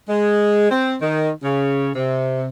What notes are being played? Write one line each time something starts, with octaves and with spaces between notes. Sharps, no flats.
G#3
C4
D#3
C#3
C3